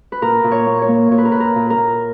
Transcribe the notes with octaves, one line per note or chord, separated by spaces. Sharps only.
B4
A#2 A#4
A#2
C#5
A#3
C#5
A#3
A#2 C#5
B4
A#4
A#2 B4
A#4
A#2
A#4
A#2